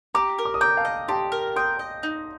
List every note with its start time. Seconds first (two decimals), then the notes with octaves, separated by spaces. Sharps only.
0.15 G4 A#5 D6
0.39 A#4
0.45 D6
0.54 D#6
0.61 G5 A#5 D6
0.77 F5 A5
0.85 D#5
1.08 G4 A5 C6
1.32 A#4
1.56 G5 C6 D#6
1.79 D#5
2.03 D#4